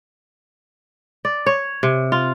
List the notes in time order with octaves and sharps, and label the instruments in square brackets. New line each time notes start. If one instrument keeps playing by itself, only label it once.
[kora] D5
C#5
C3
F4